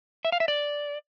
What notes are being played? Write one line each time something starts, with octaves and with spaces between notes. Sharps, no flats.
E5
F5
E5
D5